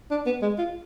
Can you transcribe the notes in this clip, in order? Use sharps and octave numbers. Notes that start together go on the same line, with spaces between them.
D4
B3
G#3
F4